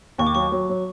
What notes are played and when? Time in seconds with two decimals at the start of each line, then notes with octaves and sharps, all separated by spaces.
0.18 D#2 C#6
0.27 D6
0.35 F#3 C#6
0.52 F#3
0.69 F#3